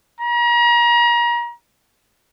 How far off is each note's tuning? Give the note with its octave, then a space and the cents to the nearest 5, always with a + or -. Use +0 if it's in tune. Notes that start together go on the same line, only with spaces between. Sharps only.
A#5 +35